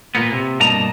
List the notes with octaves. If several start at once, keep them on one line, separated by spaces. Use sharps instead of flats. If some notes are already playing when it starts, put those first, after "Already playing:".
A#2 A#3 B3
C3
G2 B2 A#3 D#5 A5 A#5